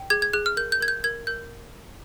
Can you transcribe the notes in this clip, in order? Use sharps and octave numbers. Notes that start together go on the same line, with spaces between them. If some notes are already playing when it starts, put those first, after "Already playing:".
Already playing: G5
G#4 G#6
G#6
G#4 F#6
F6
A#4 G6
G6
A#4 G#6
G6
A#4 G#6
A#4 G6